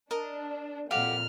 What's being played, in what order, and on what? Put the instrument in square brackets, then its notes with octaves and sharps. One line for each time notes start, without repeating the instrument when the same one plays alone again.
[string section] D4 [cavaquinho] A#4 D#5
[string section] F2 A#2 [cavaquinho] F#4 G4 F5 [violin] F6